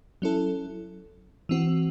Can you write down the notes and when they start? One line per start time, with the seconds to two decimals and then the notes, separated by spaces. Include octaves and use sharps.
0.22 F#3 C#4 E4 A4
1.49 E3 C4 F#4